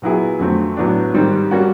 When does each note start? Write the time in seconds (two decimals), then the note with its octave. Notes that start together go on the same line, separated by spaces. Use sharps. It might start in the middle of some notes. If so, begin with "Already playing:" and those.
0.02 A#2 F#3 B3 E4 G#4
0.39 F2 D3 F#3 A3 C4
0.77 A2 F#3 B3 D4
1.14 G#2 D#3 G3 C4
1.51 G3 A#3 C#4 F#4